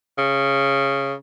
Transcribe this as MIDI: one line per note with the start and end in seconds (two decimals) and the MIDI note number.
0.18 1.13 49